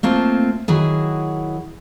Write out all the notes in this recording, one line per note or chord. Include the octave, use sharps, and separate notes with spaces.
A3 A#3 C4 F4 A5
D#3 F#3 E4 G#4